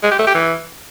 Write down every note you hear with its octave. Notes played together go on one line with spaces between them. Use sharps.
G#3
G4
A3
G4
E3